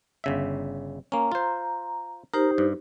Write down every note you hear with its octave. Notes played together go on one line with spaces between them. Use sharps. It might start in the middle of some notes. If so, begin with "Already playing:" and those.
G1 C#3 E5
A#3 C#4 A#5
F4 C5
D#4 G4 A#4 C5
G2